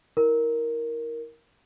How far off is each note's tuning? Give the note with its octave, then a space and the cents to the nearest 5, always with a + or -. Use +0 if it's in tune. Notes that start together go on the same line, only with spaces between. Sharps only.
E4 -30 A#4 +0